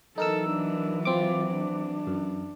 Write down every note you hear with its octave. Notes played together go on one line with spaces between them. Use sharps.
E3 F#3 D#4 A4 A#4 E6
D4
C4 F4 D6
D4
F#2